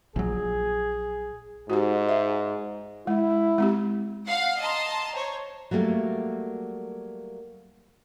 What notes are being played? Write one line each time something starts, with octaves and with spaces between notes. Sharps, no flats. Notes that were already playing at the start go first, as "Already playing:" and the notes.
A#1 F#3 G#4
G#2 F#4 G4
E5
G#3 E4
G#3 C4 G4
F5 F#5 C7
D#5 A5 A#5 C6
C5 C#5
F#3 G3 A3 A#3 A4